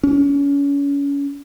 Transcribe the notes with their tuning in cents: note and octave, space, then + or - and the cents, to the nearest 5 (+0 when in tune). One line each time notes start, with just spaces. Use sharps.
C#4 +30